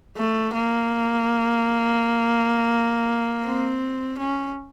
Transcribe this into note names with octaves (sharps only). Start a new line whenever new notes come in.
A3
A#3
C4
C#4